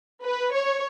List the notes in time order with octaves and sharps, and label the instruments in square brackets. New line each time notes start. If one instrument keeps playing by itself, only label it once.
[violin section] B4
C#5